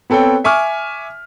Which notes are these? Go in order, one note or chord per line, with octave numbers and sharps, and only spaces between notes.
B3 C4 A4 C#5 G5
E5 G#5 C#6 D6 F6